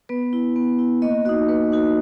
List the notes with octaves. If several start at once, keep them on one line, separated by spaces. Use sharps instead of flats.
B3 B4
E4
B3
E4
A#3 D#5
D#4 F#4 D#5
A#3 B4
D#4 F#4